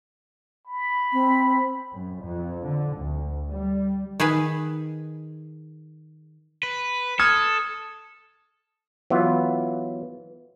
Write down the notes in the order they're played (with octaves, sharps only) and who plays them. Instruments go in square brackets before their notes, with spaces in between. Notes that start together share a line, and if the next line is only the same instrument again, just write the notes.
[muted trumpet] B5
[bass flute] C4
[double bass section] F#2
F2
D3
D2
G3
[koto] D#3 G#4 B4 G#5
[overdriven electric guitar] B4
[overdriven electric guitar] A4 [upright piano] D#6 F6 G#6
[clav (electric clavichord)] E3 F#3 B3 F4